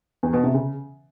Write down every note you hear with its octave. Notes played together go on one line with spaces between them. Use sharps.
E2
B2
C3
C#3